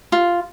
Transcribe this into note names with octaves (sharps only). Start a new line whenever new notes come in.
F4